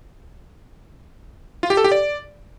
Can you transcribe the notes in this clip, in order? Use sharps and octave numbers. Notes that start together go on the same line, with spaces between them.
F4
G4
A4
G4
D5